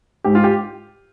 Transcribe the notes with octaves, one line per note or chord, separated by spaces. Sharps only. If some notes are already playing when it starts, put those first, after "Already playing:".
G#2 G4
F4
G4